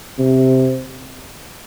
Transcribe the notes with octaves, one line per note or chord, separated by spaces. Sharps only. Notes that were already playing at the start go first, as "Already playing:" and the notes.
C3